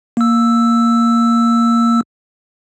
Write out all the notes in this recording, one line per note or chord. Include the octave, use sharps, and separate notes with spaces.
A#3 E6